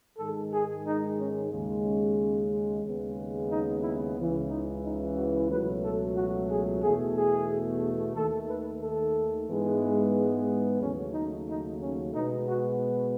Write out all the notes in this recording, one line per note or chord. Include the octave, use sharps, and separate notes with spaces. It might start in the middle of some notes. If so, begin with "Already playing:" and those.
G#2 D#3 G#3 A4
G#4
D#4
C#4
D#2 C#3 G#3
C#4
D#2 C#3 G#3 B3
D#4
E4
C#2 C#3 E3
D#4
D#4
F#4
C#2 B2 F#3 A3 B4
A4
F#4
G#4
E2 B2 A3 G#4
G#4
D#2 D#3 A3 A4
B4
A4
G#2 E3 G#3 B3
D#2 C#3 F#3 A3 C#4
D#4
D#4
C#4
B2 G#3 B3 D#4
F#4